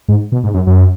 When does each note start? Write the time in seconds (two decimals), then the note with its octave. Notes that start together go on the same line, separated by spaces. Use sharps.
0.08 G#2
0.32 B2
0.44 G#2
0.54 F#2
0.67 F#2